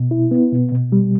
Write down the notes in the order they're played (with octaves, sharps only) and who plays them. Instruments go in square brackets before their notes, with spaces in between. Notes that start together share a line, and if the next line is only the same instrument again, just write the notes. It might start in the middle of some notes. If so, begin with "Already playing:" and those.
Already playing: [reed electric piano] B2
E4
B3
B2
B2
G3